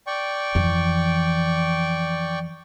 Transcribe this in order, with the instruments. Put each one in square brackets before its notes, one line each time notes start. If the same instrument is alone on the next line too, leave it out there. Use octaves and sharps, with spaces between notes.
[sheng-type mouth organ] D5 G5 C#6
[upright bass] F2 E3